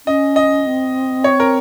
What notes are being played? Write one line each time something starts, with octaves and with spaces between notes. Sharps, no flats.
C#4 D#5
D#5
C4
C#5
A#4